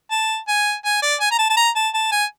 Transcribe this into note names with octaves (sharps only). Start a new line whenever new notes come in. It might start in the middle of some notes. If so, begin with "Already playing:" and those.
A5
G#5
G#5
D5
G#5
A#5
A5
A5
A#5
A5
A5
G#5